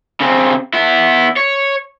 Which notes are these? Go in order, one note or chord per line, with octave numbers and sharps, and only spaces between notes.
C#3 C4
B3 E4
C#5